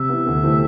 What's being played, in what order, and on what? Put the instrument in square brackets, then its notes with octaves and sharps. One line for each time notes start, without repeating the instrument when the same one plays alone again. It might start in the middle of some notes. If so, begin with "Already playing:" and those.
Already playing: [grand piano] C3 [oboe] E5
[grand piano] E3 B3
D2
C3 E3 A3 C4